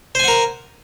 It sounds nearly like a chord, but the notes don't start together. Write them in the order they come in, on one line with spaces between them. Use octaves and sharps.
C5 G#5 F#5 A#4